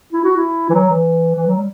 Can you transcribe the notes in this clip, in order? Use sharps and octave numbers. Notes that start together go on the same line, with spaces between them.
E4
F#4
E4
E3
F#3
E3
E3
F#3
G3